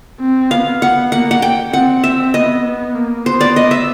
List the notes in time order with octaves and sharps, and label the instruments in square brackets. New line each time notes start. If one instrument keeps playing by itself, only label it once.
[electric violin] C4
[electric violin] B3 [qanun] F5
[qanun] F#5
[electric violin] A#3 [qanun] F#5
[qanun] F#5
G5
[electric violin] C4 [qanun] F#5
[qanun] E5
[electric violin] B3 [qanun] D#5
[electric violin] B3
A#3
[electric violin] B3 [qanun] C5
[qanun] D5
D#5
E5